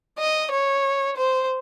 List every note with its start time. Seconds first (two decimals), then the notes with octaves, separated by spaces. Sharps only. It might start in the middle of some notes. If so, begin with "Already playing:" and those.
0.19 D#5
0.51 C#5
1.17 C5